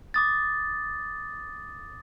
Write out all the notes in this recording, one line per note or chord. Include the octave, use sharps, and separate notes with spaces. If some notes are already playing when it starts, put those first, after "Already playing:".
D6 D#6 A6